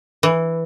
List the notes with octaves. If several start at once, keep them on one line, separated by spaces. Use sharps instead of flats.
E3